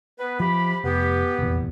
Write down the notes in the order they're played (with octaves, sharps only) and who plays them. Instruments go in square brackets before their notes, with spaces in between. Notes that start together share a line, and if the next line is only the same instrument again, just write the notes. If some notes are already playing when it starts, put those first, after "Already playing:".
[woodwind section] B3 B4
[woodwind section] C3 G4 B5 [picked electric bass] F3
[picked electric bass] F1 [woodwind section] B3 G4
[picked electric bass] F1 A#1 E2